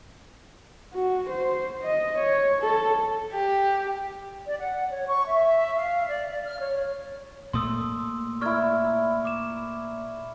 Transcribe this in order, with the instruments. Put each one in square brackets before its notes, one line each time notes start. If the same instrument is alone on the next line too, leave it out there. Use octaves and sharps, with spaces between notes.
[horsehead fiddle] F#4
C5
D#5
C#5
A4
[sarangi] G4
[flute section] D5
F#5
C#5
C#6
E5
F5
D5
D5
F6
C#5
[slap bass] A#2 A3 [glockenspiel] C6 D#6 E6
[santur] E4 A#4 D5 [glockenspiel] C#6 F6 G#6
[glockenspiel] D6 E7